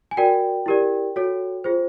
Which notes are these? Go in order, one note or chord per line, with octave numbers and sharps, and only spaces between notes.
G#5
F#4 A#4 D5 G5
E4 G4 A#4 D5
F#4 A4 C#5
F4 G#4 C5